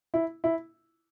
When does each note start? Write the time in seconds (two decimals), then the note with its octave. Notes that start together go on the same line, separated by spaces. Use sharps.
0.14 E4
0.44 E4